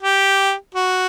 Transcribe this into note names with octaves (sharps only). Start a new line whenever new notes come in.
G4
F#4